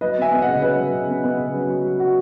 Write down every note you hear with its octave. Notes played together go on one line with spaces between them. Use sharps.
F#3 B4 D#5
B3 E5 G#5
B3
D#5 F#5
C#3
F#3 B4 D#5
F#3
C#3
B3
B3
C#3
F#3
F#4
F#3
F#4